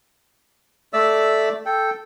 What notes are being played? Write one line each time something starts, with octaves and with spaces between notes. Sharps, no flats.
A3 D5 E5 E6
A4 G5